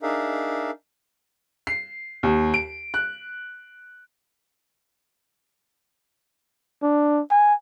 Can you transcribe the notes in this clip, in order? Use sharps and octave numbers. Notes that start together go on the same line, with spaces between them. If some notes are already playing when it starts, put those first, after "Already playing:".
D4 D#4 G#4 A#4 E5 F5
C7
D#2
D7
F#6
D4
G#5